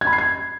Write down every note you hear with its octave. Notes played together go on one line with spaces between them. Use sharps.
G#6
B5
C7
G#6